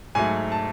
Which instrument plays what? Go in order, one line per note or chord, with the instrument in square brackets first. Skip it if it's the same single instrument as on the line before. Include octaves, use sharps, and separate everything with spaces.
[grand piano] G#2 F#3 A3 G#5
A5